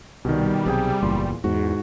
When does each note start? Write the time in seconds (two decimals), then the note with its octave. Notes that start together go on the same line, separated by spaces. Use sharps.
0.25 C2 B2 D#3 G3
0.66 B1 C3 G#4 G5
1.02 F#1 E2 A#2 C6
1.44 E2 G#2 F#4